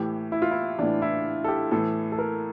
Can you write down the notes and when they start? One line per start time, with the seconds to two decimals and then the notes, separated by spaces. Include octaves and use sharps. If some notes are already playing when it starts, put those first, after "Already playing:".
Already playing: A2 E3 G4
0.32 E4
0.42 F4
0.51 E4
0.79 A2 E3 D4
1.02 E4
1.44 A4
1.48 G4
1.71 A2 E3 A4
2.12 A4
2.19 A#4